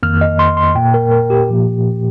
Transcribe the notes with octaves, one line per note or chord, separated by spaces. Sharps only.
F2 D#3 A#3 F6
D#5
C6
C6
A#2 A#3 G5
A#4
A#4
G4
A#2 F3 A#3